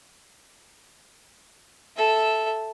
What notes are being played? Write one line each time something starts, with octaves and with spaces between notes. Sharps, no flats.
A4 E5